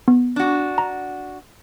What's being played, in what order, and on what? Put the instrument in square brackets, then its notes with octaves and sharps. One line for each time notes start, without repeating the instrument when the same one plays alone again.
[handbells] B3
[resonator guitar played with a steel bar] D4 F#4
[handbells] A#5